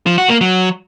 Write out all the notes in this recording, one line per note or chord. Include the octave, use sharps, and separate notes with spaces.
F3
F#4
A#3
F#3